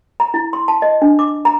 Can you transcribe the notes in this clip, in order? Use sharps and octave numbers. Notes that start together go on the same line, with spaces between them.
A#5
E4
C6
A5
D#5
D4
D6
A#5